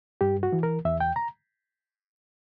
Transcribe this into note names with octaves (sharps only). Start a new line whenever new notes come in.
G2 G4
F#4
E3
A#4
E2 E5
G5
A#5